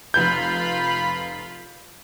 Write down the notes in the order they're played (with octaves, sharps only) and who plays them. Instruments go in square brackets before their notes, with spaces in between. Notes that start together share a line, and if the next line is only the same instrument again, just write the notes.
[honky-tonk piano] F1 B4 G#6 [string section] F4 B5 [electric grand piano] G6